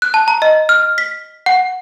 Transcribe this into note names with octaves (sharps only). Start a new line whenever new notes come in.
F#6
A5
A#5
D#5
F6
B6
F#5